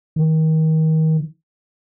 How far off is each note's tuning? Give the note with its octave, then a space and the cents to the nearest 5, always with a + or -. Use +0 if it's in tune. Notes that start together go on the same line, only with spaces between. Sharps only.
D#3 +30